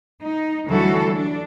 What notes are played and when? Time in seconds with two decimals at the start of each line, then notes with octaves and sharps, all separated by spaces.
0.20 D#4
0.67 D2 E3 F#3 G3 F#4 A4
1.13 D4